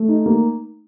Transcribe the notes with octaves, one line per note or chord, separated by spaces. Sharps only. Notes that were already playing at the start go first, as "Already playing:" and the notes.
Already playing: A3
D#4
A#3